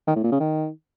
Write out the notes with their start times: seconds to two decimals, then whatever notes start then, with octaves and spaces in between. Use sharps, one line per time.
0.08 D#3
0.16 A2
0.24 A#2
0.32 C#3
0.40 D#3